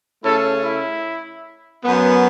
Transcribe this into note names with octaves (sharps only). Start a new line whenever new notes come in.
C#3 A3 C#4 E4 A4
E4
F#2 F#3 B3